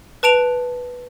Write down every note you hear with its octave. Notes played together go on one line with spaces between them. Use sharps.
B4 A5 D7 F7